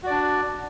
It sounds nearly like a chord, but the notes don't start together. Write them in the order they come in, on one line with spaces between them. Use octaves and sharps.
F#4 D5 D4